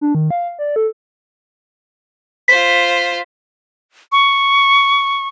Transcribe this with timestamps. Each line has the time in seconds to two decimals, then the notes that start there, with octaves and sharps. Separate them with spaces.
0.01 D4
0.15 D#3
0.30 F5
0.59 D5
0.76 A4
2.48 F4 C5 B6
4.12 C#6